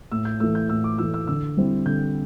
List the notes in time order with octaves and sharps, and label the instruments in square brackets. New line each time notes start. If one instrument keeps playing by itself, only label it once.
[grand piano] A2 E6
G6
E3 A3 E6
G6
A2 E6
D6
E3 A3 E6
E6
D3 E6
G3 C4 E4
D3 G6